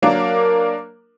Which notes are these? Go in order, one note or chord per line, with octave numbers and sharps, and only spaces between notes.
F#3 A#3 D4 A#4